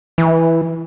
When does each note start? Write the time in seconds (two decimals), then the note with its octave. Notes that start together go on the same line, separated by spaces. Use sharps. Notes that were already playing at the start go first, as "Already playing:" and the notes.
0.18 E3